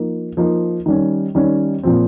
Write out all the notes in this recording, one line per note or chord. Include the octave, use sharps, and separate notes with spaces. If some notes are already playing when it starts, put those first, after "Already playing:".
Already playing: F3 A#3 D#4
F3 A#3 D#4
D#3 G3 C#4
D#3 G3 C#4
A#2 F3 C4